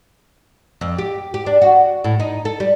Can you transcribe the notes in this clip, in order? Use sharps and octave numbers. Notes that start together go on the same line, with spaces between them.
F2
G4
G4
D4
F#4
A2
D#4
A4
G3